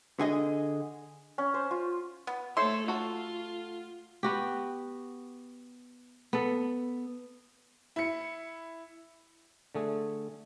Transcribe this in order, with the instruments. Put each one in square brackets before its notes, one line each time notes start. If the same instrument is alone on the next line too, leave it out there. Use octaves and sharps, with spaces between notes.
[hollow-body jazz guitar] D3 G#4 D#5
[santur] C#4
C5
F4
[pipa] B3
[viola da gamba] A3 A4 [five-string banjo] C5 C#5 E5 [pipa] C6
[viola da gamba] F4 [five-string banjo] F#4 A4
[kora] B3 F#4 G4
B3 A4
[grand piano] E4 C#7
[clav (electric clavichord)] D3 A3 G#4